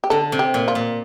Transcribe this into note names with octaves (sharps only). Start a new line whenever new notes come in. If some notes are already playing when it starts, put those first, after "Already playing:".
G4
D3 A4
C3
G4
A#2
F4
A#2